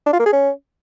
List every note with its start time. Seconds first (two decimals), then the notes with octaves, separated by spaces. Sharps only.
0.06 D4
0.13 F4
0.19 A#3
0.26 G#4
0.33 C#4